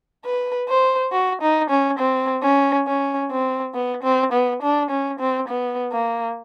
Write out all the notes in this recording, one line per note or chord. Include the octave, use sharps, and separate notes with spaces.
B4
C5
F#4
D#4
C#4
C4
C#4
C#4
C4
B3
C4
B3
D4
C#4
C4
B3
A#3